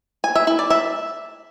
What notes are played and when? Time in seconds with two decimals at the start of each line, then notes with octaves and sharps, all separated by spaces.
0.24 G#5
0.35 E5
0.47 E4
0.59 D5
0.70 E5